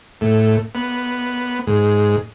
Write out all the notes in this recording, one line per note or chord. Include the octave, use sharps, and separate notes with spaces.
A2
B3
G#2